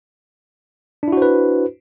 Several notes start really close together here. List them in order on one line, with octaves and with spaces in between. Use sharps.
D4 E4 F#4 C5 B4